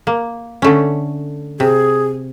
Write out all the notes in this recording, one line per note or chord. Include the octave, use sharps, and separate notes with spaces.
A#3
D3 A3 C#4
C3 G#4